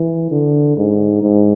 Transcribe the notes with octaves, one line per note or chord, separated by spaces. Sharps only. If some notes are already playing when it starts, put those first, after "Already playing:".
Already playing: E3
D3
G#2
G#2